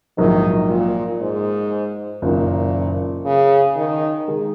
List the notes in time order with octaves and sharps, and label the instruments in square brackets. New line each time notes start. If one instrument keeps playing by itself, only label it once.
[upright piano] A#1 G#2 F#3 A#3 [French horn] D#3
[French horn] A#2
G#2
[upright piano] F#1 F#2 D#3 [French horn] A#2
[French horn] C#3
D#3
[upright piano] D#3 G#3